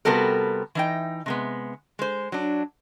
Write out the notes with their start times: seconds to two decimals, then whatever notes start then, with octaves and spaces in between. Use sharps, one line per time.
0.05 C3 G3 B3 F#4 A4 A#4
0.75 E3 D#4 G5
1.26 C3 G#3 B3
1.99 G#3 C5
2.32 F#3 D4